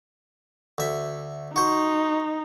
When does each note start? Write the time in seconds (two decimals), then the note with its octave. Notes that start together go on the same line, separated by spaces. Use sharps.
0.78 D2 E5
1.56 D#4 F#4 C5